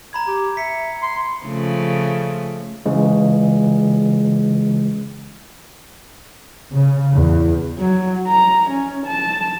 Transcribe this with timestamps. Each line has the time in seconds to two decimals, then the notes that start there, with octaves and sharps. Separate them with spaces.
0.13 A#5 B5 G#6
0.27 G4
0.57 E5 B6 C#7
1.02 C6
1.46 C#3 F3 A3
2.86 C#3 E3 G#3
6.70 C#3
7.14 E2
7.79 F#3
8.27 A#5
8.71 C#4
9.07 A5